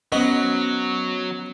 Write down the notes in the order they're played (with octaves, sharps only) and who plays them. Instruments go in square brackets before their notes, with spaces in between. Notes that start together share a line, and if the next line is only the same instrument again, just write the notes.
[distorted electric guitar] F#3 [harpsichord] B3 [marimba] C#4 C5 [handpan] D#5